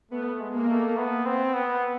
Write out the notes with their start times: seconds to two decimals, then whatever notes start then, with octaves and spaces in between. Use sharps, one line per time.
0.11 A3 B3
0.40 G#3
0.54 A#3
0.69 A3
0.97 B3
1.26 C4
1.54 B3